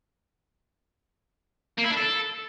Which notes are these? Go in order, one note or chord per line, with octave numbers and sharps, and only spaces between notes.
A#3
E4
D4
A4